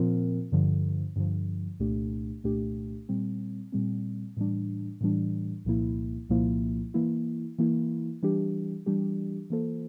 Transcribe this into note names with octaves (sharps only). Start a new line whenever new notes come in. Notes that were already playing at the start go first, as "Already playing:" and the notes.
Already playing: A#2 F3 C4 F4 A#4
G2 D3 F3
G2 D3 F3
C2 A#2 A3 D4 G4
C2 A#2 A3 D4 G4
A#2 G3 C4
A#2 G3 C4
A2 E3 G3 D4
A2 E3 G3 D4
C2 A#2 F3 A#3 E4
C2 A#2 F3 A#3 E4
E3 A#3 E4
E3 A#3 E4
E3 G3 D4 G4
E3 G3 D4 G4
E3 A#3 F4 A4 C5